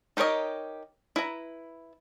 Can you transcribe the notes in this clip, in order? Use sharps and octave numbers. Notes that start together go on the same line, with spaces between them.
D#4 G4 A#4 C#5 D#5
E4 B4 A#5